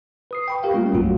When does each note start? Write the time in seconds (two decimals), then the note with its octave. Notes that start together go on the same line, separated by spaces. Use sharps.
0.31 B4 D#6 C7
0.48 G5 B5 C#6
0.63 G4 A#4 F5 G5
0.74 G3 A3 A#3 C#4 F4
0.92 A1 F2 G#2 F#3 F4 F#4